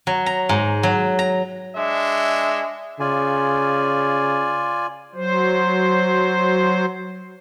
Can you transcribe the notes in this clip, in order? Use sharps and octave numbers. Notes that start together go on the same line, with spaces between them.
F#3
A#5
G#2
F#3
A#5
G#3 D4 E5
C#3 F4 D5 G#5
F#3 C5